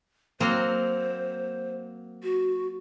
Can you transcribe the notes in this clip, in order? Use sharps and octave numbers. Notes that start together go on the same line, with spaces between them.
F#3 A#3 C4 C5
F#4